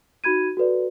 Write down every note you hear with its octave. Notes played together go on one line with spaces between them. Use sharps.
D#4 F#4 B5 G#6 D#7
F#4 A4 B4 D5